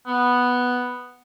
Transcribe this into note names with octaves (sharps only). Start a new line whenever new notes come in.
B3